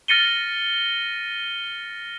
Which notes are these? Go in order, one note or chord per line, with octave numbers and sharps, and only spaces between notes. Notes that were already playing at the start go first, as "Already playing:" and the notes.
F6 A6 A#6 C#7 D#7 G7